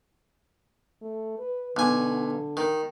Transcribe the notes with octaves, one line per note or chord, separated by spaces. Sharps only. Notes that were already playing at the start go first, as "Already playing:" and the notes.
A3
B4
B1 D3 G#5
D#3